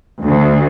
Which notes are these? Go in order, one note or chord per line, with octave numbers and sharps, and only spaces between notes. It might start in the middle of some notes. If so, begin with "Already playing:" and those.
D2